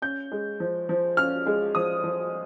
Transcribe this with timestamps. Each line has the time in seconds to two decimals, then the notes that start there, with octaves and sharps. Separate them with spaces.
0.02 C#4 G6
0.32 G#3
0.60 F3
0.89 F3
1.17 C#4 F6
1.46 G#3
1.75 F3 D#6
2.04 F3